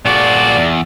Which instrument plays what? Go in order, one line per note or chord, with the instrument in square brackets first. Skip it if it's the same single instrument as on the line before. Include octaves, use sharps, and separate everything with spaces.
[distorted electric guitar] A#2 F#4 [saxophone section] F3 G#4 D5
[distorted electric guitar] E2